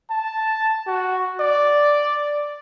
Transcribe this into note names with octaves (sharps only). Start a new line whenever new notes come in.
A5
F#4
D5